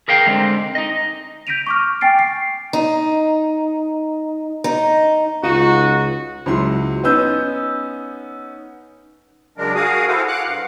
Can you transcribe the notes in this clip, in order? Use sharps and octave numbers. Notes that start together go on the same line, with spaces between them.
G#4 A#4 F5 G5
D3 G#3 A#3 C4
D#4 D#5
G6 A#6 B6 D7 D#7 F7
C#6 D6 F6
G5 G#5 A6 C7 D7
C7
D#4
D#4
C#2 D#4 F4 F#4
C#2 F#3 E4 C6
B3 C#4 D#4 E6 G6
C#3 F#3 G#3 D4 A#4
F#4 G#4 A#4 F5 D#6
E4 F#4 G#4 A4 C5 F5
F5 F#5 D6 F#6
G2 F5